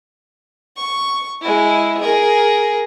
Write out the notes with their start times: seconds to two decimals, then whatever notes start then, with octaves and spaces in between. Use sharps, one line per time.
0.76 C#6
1.41 G#3 E4
2.01 G#4 A#4